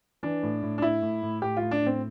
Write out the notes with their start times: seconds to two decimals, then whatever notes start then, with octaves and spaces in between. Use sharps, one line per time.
0.23 E3 D4
0.43 A2
0.63 A2
0.78 D4
0.82 A2 E4
1.02 A2
1.22 A2
1.42 A2 G4
1.57 A2 F4
1.71 D4
1.82 A2 C4